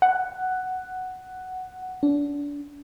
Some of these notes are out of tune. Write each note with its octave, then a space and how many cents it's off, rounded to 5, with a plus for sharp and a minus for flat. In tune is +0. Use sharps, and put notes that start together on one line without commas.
F#5 +5
D4 -30